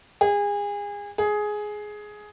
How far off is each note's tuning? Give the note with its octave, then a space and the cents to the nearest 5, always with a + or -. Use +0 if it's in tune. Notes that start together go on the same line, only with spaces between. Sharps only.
G#4 -30
G#4 +10